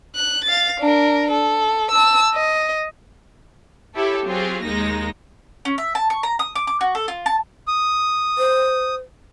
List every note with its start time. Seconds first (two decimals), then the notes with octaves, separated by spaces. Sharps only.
0.15 F#6
0.44 F5 A6
0.80 D4 A#4
1.31 A4
1.91 A5 E6
2.34 D#5
3.95 E4 G4 A4 C#5
4.26 F#3 C4 F4 G4 G#4
4.63 D#2 G#3 A#3 D#4 A#6
5.65 C#4
5.78 E5
5.95 A5
6.10 C#6
6.23 A#5
6.39 D#6
6.55 D6
6.67 D6
6.81 F#4
6.95 A4
7.08 F4
7.26 A5
7.67 D#6
8.38 C5